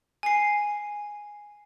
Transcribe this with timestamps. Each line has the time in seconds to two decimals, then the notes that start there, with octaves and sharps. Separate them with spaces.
0.23 G#5 C7